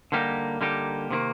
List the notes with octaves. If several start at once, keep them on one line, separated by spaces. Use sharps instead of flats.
D3 G3 A#3 D#4 G4
D3 G3 A#3 D#4 G4
C3 D#3 A#3